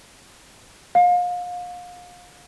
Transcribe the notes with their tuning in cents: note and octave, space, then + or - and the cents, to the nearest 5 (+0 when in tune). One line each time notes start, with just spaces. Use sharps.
F5 +30